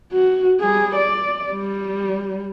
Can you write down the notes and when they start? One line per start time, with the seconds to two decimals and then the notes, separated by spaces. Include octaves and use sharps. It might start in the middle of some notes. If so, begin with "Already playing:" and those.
0.13 F#4
0.60 G3 G#4
0.96 D5
1.52 G3